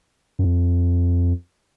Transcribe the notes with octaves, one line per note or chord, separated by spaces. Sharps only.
F#2
F2